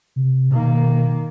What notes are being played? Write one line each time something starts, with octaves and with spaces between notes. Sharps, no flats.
C3
B2 D#3 A#3